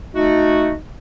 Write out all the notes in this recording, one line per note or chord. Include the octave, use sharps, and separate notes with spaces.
A3 D#4 F#4